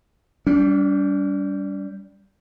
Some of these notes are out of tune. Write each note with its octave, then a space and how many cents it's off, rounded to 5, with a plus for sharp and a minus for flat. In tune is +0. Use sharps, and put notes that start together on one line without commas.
G3 +0 D4 -45